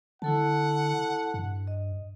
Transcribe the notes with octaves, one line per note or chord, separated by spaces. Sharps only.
D3 E4 A4 F#5 A5
G2
D#5